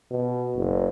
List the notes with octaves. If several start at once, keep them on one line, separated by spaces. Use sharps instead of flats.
B2
F#1